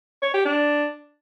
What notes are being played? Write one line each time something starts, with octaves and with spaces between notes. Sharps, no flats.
C#5
G4
D4